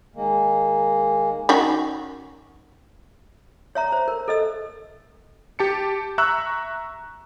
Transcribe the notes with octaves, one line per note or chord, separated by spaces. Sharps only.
D#3 G#3 A#3
D#3 C#4 F#4
C#5 E5 A#5
C5
A#4
A4 D#5 E6
G4 A5 C#7
E5 A#5 C#6 E6 F#6